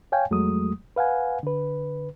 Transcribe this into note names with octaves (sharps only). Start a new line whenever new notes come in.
C#5 F5 G5 G#5
F2 F#3 G#3 A3 D#6
B4 F5 F#5 G#5
D3 B4